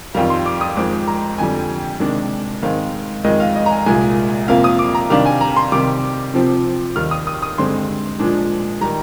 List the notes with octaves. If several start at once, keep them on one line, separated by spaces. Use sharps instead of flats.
F2 D#3 G3 F5
C6
D6
D#6
F2 D#3 G#3 C4 D6
A#5
F2 D3 G3 G#5
C3 D#3 G#3 D4
G#2 D#3 G#3 C4 F5
F2 D#3 G#3 D#5
F5
D#5
A#5
G#5
C2 A#2 G#3 G#5
F2 C3 F3 A#3 F5
D#6
D6
A#5
C3 D#3 G3 D4 F5
G#5
A#5
C6
C3 D#3 G3 D6
C3 F3 C4
D#2 D#3 G3 F6
D#6
D#6
D#6
G2 D3 G#3 C4 C6
A#2 F3 G#3 D4
D#3 G3 A#5